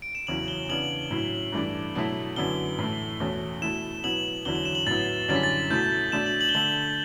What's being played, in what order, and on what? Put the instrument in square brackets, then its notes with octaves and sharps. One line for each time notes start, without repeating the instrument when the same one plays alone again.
[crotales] D7
E7
[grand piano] E2 C#3 F#3 C#4 E4 [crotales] F#7
[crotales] G7
[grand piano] C#3 E3 B3 D4 [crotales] F#7
[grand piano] A2 F#3 C#4 E4
G2 E3 A3 D4
B2 F#3 A3 E4
[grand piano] F#2 D3 F#3 B3 E4 [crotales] G7
[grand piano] A2 E3 A3
E2 B2 A3 C#4
[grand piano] B2 A3 E4 [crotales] E7
[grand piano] B2 F#3 B3 E4 [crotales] F#7
[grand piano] E2 D3 F#3 C#4 E4 [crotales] G7
[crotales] F#7
E7
F#7
[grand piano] A2 F#3 B3 E4 [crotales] A6
[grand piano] F#2 D3 G3 C#4 E4 [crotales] A6
[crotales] B6
A6
[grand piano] B2 A3 E4 [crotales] G6
[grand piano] B2 A3 D4 [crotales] E7
[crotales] F#7
F#7
G7
[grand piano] D3 A3 D4 [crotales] F#7